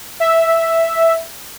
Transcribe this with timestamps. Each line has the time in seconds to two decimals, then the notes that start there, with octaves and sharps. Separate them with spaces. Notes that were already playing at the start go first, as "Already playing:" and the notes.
0.20 E5